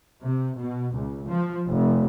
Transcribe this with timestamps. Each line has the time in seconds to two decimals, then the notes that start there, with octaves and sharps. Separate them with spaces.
0.23 C3
0.56 B2
0.94 C#2
1.29 F3
1.69 F1